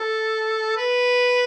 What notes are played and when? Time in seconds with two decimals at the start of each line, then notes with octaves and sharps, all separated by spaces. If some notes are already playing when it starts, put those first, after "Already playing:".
Already playing: A4
0.77 B4